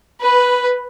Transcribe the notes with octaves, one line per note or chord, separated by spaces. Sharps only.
B4